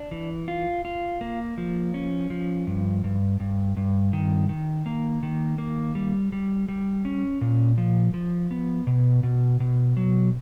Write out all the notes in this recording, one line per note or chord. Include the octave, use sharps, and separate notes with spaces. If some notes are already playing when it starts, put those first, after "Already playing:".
Already playing: D4
E3
F4
F4
A#3
F3
C#4
F3
G2
G2
G2
G2
D#3
D#3
A#3
D#3
A#3
G3
G3
G3
C#4
A#2
F3
F3
B3
B2
B2
B2
F#3